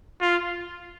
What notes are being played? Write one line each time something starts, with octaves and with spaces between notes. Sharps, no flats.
F4